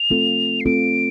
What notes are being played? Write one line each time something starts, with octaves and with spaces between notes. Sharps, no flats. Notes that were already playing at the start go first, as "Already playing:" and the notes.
Already playing: F7
A3 C4 F4 A4
C7
A3 C4 F4 A4 D7